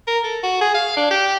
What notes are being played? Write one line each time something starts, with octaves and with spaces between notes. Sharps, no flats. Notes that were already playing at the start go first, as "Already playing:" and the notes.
A#4
A4
F#4
G#4
F5
D4
G4